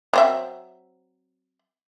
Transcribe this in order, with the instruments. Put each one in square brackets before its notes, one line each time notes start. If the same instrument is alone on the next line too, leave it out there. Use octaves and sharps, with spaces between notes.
[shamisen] F#3 C4 E5